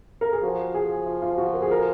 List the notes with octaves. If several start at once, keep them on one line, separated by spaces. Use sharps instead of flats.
A#4
G#4
F3 F#4
G#4
F4
F4
F#4
A#4
G#4
A#4